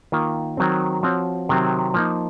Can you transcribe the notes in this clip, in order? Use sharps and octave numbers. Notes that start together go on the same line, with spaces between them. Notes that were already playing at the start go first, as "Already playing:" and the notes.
D#3 A#3 F4
D#3 F#3 C4
F3 C4 F#4 C#5
C3 D#3 F#3 C4
F3 A#3 D#4